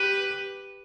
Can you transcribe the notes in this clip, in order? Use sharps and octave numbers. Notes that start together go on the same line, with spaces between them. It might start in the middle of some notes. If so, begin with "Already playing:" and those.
Already playing: G4 B4